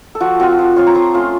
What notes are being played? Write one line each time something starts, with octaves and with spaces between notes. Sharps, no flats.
A4
F3 F#4
C4 F4 F#4
F3
C4 F4 C#5
A#5
F3 C6
A3 C#4 F4